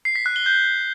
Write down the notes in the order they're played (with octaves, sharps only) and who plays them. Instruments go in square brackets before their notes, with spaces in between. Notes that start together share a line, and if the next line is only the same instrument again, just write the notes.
[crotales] C7
B6
F#6
G7
G6